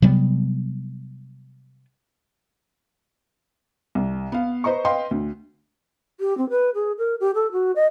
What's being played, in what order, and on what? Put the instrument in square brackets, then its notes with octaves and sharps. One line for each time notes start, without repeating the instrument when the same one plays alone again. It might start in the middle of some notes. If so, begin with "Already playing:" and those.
[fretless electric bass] C3 F#3 G3 B3
[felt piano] C2
B3 F5
B4 C5 D#5 A#5 C#6
B4 D#5 F5 G5 C6
D2
[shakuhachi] G4
C4
B4
G#4
A#4
G4
A4
F#4
D#5